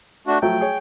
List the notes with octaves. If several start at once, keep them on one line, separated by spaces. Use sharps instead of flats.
A3 D4 F#4
F3 F#3 A3 G5
G#4 C#5